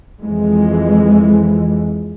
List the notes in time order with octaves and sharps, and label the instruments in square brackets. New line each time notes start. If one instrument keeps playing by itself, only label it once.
[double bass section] F2 E3 G#3